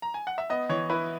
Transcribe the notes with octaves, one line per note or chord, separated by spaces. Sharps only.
A#5
G#5
F#5
E5
B3 D#5
E3 C#5
E4 B4